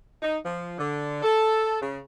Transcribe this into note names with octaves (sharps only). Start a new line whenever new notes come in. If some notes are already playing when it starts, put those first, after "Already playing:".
D#4
F3
D3
A4
C#3